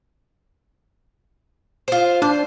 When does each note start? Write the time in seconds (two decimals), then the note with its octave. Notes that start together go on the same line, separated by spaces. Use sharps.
1.88 F4 C5
2.22 D4 C5